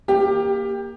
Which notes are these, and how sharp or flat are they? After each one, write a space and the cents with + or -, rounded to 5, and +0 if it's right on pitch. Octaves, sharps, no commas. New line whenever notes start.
A#3 +0 G4 +20 G5 +0